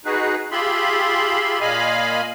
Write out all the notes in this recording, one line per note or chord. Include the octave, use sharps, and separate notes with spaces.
D#4 F#4 G#4 B4
F4 G4 G#4 E5 B5 C6
A#2 D#5 F5 G#5 B5